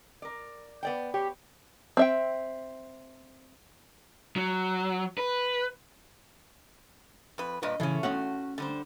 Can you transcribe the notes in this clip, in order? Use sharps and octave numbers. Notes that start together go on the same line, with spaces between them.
A#4 D5
B3 D5 G5
G4 C#5
C4 E5 G5
F#3
B4
F2 B4
G2 A#2 B4 D#5
C#3 E3 A3 C#4
A3 C#4 F#4 F#5
D3 G3 C5